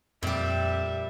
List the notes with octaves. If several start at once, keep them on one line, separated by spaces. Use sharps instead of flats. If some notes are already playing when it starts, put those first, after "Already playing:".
F2 A#2 G3 G4 E5